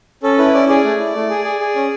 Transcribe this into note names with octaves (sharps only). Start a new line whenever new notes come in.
C#4 A4
E4 B4
C#4 D5
G#4 D5
A3
E4
A3
G#4
G#4
G#4
C#4